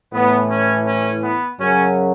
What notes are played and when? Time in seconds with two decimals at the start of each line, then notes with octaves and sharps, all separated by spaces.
0.13 A2 E3 B3
0.50 C#4
0.87 C#4
1.24 B3
1.60 F#2 C#3 F#3 C#4